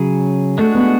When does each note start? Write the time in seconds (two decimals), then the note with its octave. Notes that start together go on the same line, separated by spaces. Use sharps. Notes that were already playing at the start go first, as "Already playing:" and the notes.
Already playing: C#3 F#3 C#4 G#4
0.58 G#3 A3 D4 F#4
0.75 B3